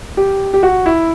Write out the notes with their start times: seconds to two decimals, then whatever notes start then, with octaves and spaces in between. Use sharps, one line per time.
0.17 G4
0.54 G4
0.63 F#4
0.86 E4